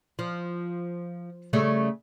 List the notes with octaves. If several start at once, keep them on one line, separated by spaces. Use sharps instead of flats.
F3
C#3 G3 A3